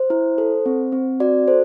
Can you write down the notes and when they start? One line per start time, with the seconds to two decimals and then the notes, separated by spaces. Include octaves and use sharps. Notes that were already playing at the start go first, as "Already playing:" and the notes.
Already playing: C5
0.10 E4
0.38 A4
0.66 C4
0.92 C4
1.20 F#4 D5
1.48 A4 C5